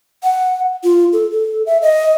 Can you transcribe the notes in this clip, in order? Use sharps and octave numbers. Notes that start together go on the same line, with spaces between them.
F#5
F4
A4
A4
E5
D#5